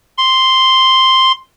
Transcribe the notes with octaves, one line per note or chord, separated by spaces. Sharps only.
C6